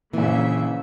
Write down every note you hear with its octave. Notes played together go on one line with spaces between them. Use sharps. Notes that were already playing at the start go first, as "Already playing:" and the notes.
A#1 A#2 C#3 E3 A#3 E5